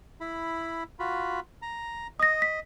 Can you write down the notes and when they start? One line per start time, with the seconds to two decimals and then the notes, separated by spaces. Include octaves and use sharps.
0.21 E4 B5
0.99 F4 F#4 B5
1.62 A#5
2.20 D#5 D#6 A#6
2.42 B6